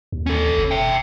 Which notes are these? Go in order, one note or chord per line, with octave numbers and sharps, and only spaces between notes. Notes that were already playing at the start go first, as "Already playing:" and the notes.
D#2
C#4 A4
F#1
E5 G5